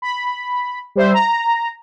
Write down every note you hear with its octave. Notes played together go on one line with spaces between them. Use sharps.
B5
G3 C5 E5
A#5